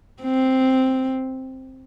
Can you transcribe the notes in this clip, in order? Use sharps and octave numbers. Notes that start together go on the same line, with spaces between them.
C4